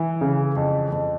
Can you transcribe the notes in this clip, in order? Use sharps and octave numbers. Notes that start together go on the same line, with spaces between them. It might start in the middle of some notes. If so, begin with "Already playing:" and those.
Already playing: E3
C#3
F2
F2